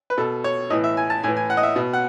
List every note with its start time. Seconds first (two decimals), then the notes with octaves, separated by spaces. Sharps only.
0.10 B4
0.17 B2 A4
0.44 C#5
0.70 A2 D#5
0.73 E3
0.84 E5
0.97 G#5
1.10 A5
1.23 A2 E3 G#5
1.37 G#5
1.50 F#5
1.57 D#5
1.63 E5
1.76 B2
1.93 F#5